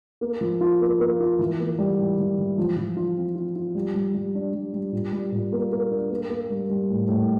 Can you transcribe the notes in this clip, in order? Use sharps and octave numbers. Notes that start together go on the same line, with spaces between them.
A#3
F3
F4
A#3
A#3
F4
E3
A#3
G3
E3
E3
E3
F3
F3
F4
C4
F4
F4
G3
G3
G3
D4
G3
G3
A#2
G3
A#2
A#3
A#3
D4
A#3
A#3
G3
G3
A2
A2